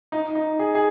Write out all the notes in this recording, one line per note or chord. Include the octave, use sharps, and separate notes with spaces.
D#4
D#4
G#4
G#4